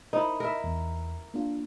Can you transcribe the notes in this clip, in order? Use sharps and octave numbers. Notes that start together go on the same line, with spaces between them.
D#4 E4 A#4 C5
A#4 E5 B5
E2
A#3 D4 F4